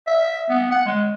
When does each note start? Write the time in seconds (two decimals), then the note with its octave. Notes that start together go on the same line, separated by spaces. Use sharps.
0.07 E5
0.50 B3
0.71 F#5
0.86 G#3